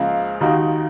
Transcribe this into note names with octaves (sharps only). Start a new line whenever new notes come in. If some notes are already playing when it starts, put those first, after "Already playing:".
Already playing: C#2 C#3 F3 A#3
D#2 D#3 A#3 D#4 F#4